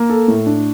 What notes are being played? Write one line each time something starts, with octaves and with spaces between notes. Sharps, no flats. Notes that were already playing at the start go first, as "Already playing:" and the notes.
Already playing: A#3
A4
A2
D4